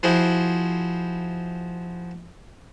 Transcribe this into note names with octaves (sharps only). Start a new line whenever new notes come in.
F3 E4 F#4 G#4 C5